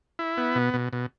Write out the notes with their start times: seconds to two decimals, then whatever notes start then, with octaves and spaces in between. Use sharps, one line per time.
0.19 E4
0.37 B3
0.55 B2
0.74 B2
0.93 B2